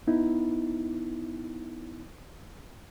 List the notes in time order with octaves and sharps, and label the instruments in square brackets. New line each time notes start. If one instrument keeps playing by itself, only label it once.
[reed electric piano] B3 D#4 E4